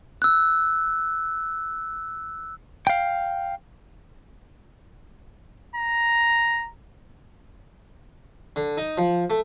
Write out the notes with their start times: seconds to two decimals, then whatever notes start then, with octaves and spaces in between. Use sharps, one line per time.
0.22 E6 F#6
2.87 F5 G5
5.76 A#5
8.56 D3
8.77 D#4
8.98 F3
9.30 A3